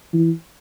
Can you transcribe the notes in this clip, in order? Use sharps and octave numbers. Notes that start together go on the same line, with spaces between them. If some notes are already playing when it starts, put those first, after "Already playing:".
E3